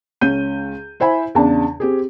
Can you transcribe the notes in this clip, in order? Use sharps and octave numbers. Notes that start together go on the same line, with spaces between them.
C#2 C#4 G6 D#7
E4 C5 E5 G#5 B5
E2 C#3 D4 A5
C4 G4 G#4